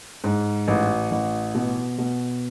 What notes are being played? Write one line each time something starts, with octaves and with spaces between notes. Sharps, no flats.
G#2
A1
A1
B2
B2